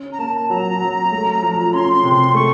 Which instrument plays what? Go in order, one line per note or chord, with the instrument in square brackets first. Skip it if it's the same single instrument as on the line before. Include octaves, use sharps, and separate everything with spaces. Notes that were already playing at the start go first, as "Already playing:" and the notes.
Already playing: [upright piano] C#4
[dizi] A#5
[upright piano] A#3 [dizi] A5
[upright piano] F#3 [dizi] A#5
[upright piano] F#3
A3
F3
[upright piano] C#4 [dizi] C6
[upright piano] C3
[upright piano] A3 [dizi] C#6